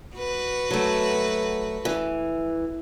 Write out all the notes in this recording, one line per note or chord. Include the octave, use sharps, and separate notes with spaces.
F#4 B4
F#3 A3
E3